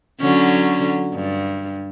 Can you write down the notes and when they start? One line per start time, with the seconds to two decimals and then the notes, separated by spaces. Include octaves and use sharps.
0.20 D3 F#3 C#4
1.14 G2